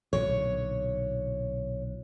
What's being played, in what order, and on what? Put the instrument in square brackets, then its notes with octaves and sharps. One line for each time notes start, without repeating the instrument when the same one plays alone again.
[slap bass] B1 A#2 D3 [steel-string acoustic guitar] C#5